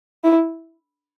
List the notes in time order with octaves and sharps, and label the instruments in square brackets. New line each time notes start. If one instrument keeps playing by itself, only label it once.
[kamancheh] E4